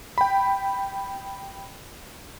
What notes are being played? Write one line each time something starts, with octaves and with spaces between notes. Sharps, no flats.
G5 B5